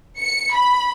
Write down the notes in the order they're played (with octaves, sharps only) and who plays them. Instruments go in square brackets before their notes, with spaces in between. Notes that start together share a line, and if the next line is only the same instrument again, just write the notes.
[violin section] C#7
B5